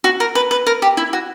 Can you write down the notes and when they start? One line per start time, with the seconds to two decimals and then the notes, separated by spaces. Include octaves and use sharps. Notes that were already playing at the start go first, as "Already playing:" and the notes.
0.04 F#4
0.20 A#4
0.35 B4
0.51 B4
0.67 A#4
0.82 G4
0.97 E4
1.13 F#4